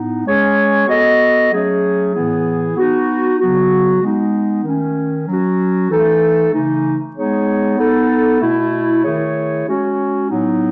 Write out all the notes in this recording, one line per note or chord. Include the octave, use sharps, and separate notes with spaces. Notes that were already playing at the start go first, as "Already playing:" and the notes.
Already playing: A2 B3 D#4
G#3 C#4 G#4 C#5
B3 F#4 A4 D#5
F#3 A3 C#4 G#4 C#5
A2 E3 B3 E4 G#4
B3 D#4 F#4
C#3 F#3 B3 F#4
G#3 B3 D#4
D#3 A3 C#4
F#3 C#4 F#4
E3 A3 D#4 A4
C#3 E3 A3 D#4
G#3 B3 D#4 G#4 C#5
B3 D#4 A4
B2 A3 E4
D#3 A3 E4 G#4 C#5
G#3 C#4 F#4 C#5
A2 F#3 B3 D#4